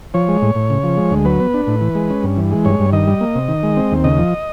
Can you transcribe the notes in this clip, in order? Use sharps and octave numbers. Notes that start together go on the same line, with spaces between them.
F3 C#5
G#3
A2
A2
C#3
F3
G#3
D2
F#3 B4
B3
D4
A2
E3
G#3
C#4
G2
E3
G#3
G2 C#5
G2
D#3 D#5
G3
A#3
C3
D#3
G#3
C4
D#2
C#3 D#5
F3